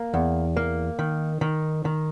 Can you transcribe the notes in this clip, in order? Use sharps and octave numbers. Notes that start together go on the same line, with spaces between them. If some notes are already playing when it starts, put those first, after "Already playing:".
Already playing: A#3
E2
A#3
D#3
D#3
D#3